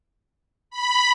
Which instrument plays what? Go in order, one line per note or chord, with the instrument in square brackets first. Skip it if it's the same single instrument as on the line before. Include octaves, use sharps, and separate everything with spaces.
[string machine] B5